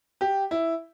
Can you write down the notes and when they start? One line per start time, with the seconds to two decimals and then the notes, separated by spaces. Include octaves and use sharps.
0.21 G4
0.51 E4